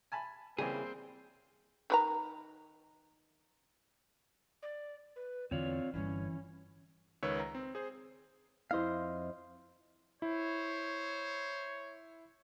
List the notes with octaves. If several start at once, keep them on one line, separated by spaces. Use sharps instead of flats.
G#5 A5 B5
C#3 E3 G3 A#3 C4 G#4
D#3 B4 A#5
D5
B4
E2 D3 E3 C4 F4 C#5 D5
G1 G2 E3 C#4
C#2 D#3 B4 C#5 E6
A#5
C4
G#4 C5
F2 E4 C5 D#5 F5
E4 C5 C#5